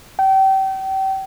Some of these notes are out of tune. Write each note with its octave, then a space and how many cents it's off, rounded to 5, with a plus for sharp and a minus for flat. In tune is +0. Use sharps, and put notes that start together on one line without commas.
G5 -30